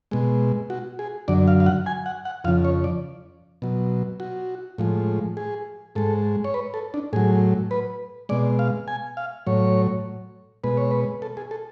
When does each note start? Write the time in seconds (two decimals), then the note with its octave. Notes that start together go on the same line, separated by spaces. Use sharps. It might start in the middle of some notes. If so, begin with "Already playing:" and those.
0.11 B2 G#3
0.70 F#4
0.99 G#4
1.28 F#2 D3 F#3 D5
1.48 F5
1.60 F5
1.66 F#5
1.86 G#5
2.06 F#5
2.25 F#5
2.44 F2 C#3 F3 F5
2.65 C#5
2.84 D5
3.62 B2 F#3
4.20 F#4
4.78 A2 F3 G#3
5.37 G#4
5.95 G#2 G#3 A4
6.44 C#5
6.54 B4
6.74 A4
6.94 D4
7.13 A2 F#3 G#4
7.71 B4
8.29 B2 G#3 D5
8.59 F5
8.88 G#5
9.17 F5
9.47 A2 F#3 C#5
10.64 B2 G#3 B4
10.77 C#5
10.91 B4
11.22 A4
11.37 G#4
11.51 A4